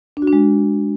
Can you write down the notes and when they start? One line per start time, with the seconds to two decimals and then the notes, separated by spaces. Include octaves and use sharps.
0.17 D4
0.22 F#4
0.27 D4
0.33 G#3